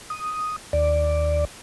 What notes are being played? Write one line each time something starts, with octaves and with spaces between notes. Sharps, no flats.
D#6
D#2 D5